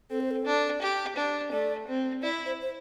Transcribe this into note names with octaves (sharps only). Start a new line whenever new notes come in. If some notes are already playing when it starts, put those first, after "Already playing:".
C4 A4
C5
A4
D4
G4
D4
A3 D5
C4
E4 D5
C5
C5